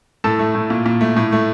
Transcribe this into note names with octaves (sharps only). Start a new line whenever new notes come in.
A2 A4 A5
A3
A2
A#2
A#2
A3
A2
A3